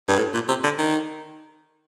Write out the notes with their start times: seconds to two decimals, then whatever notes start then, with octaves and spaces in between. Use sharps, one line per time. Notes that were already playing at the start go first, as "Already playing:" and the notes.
0.09 G2
0.18 A2
0.34 A#2
0.49 C3
0.63 D3
0.78 D#3